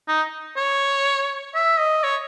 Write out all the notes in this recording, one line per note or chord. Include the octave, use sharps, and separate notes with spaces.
D#4
C#5
E5
D#5
C#5